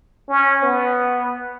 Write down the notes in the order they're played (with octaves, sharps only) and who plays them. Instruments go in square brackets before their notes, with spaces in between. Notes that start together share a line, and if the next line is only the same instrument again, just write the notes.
[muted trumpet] C#4
B3